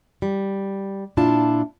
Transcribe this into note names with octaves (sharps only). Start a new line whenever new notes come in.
G3
A#2 D4 E4 F4 A5